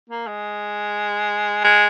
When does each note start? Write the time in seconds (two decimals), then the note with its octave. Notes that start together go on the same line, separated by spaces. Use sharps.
0.09 A#3
0.27 G#3
1.64 G#3